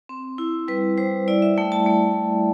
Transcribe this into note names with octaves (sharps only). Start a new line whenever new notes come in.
C4
E4
G3 B4
G3 C5
E4 D5
E5
A3 G5
A5
A3